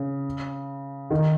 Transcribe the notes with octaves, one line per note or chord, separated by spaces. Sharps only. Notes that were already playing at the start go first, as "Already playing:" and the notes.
Already playing: C#3
D#3